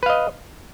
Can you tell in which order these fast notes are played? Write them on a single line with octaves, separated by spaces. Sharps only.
B4 F5 D#5